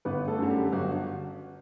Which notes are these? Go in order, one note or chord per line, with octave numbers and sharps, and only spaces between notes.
G1 B3 B4
A3 A4
F#2 D3
G3 G4
G1 F#3 F#4